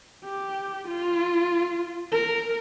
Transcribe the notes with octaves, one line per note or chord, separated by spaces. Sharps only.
G4
F4
A#4